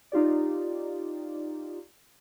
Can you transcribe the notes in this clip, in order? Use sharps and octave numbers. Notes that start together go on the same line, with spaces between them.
D#4 F4 G4 D5